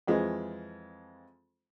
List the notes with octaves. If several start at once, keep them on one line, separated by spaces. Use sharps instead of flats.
F2 E3 F3 G#3